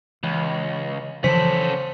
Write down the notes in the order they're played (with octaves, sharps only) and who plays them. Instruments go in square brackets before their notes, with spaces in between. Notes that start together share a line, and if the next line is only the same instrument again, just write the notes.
[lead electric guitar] C#2 [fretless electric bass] E3
[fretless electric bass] C#3 E3 F3 [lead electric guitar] C#4 A4 [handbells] C5 B6